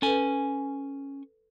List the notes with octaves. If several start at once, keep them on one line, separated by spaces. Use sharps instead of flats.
C#4 A4 B4 G#5